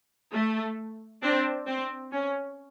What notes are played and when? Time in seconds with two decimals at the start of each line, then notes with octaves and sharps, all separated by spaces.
0.33 A3
1.22 C4 D4
1.67 C4
2.12 C#4